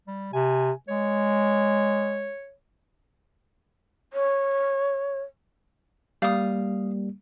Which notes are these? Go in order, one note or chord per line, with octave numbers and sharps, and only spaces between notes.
G3
C3 G#5
G#3 C#5
C#5
G3 A#3 F5 D#6